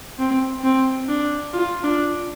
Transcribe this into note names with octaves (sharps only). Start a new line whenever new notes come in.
C4
C4
D4
F4
D4